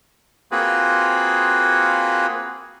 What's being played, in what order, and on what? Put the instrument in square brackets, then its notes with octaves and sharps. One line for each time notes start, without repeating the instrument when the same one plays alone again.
[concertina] A#3 C4 F4 F#4 G#4 B4